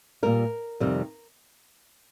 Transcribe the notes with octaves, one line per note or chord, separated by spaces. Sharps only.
A#2 G3 A#4
F2 C3 D#3 G3